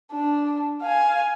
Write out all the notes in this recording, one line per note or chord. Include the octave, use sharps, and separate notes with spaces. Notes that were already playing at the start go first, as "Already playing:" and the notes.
D4
F5 G#5